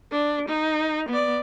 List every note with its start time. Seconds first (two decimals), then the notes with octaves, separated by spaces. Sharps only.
0.12 D4
0.49 D#4
1.09 B3 D5